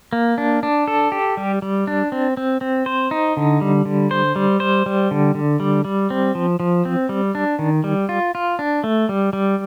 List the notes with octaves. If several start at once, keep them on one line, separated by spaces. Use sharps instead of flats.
A#3
D4
D4
A4
G4
G3
G3
D4
C4
C4
C4
C5
D#4
D3
G3
D3
C5
G3
C5
G3
D3
D3
G3
G3
C4
F3
F3
C4
G3
D4
D#3
G3
F4
F4
D4
A3
G3
G3